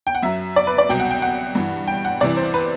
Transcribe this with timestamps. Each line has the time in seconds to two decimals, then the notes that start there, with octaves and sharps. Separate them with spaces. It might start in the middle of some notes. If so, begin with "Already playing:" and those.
0.07 G5
0.15 F#5
0.23 F#2 F#3 E5
0.56 D5
0.67 B4
0.78 D5
0.89 C2 B2 F#3 G5
1.00 F#5
1.11 G5
1.22 F#5
1.55 G2 E3
1.87 G5
2.05 F#5
2.21 C2 C3 E3 D5
2.37 C5
2.54 B4